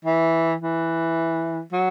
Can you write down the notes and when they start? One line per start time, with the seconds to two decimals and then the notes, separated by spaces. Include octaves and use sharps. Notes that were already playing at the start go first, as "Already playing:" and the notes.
0.05 E3
0.61 E3
1.72 F#3